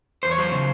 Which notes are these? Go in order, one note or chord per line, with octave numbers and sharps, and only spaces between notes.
E2 C5
C#5
F#3 C5
C#3